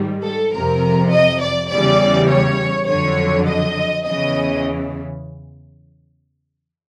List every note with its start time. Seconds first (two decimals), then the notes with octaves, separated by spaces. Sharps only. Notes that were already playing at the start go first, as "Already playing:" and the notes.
Already playing: G#2 D#3 G3
0.23 A4
0.53 F2 C3 F3 A#4
1.11 D#5
1.41 D5
1.70 E2 C#3 E3 G3 D5
2.30 C#5
2.87 F2 D3 F#3 C#5
3.46 D#5
4.05 E2 C#3 E3 D#5